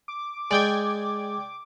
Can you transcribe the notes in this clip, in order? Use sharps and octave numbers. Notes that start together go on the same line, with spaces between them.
D6
G#3 D5 G5 G#6